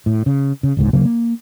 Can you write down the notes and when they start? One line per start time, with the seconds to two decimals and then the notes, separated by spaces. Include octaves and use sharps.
0.06 A2
0.26 C#3
0.63 C#3
0.77 G1 C#2 G#2
0.93 D2 C#3 F#3 A#3
1.05 A#3